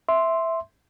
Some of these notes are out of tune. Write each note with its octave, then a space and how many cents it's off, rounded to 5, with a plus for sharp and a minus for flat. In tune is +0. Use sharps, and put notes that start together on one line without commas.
E5 -5 C6 +0